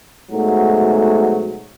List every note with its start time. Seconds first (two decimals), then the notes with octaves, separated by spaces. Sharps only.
0.31 G#2 B2 F#3 A3